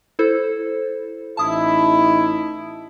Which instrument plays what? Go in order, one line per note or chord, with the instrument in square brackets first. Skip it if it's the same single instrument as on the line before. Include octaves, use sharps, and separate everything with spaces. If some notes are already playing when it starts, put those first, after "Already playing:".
[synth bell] E4 A4 C5
[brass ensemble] A1 D#4 E4 [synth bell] A5 D#6